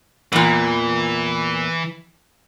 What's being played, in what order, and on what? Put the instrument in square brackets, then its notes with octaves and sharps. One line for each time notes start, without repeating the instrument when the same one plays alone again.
[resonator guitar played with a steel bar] E2 A#2 [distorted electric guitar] E3